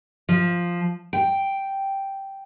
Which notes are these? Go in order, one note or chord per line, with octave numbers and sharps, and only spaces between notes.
F3
G5